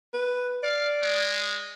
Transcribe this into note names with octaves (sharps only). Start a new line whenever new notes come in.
B4
D5 F5
G#3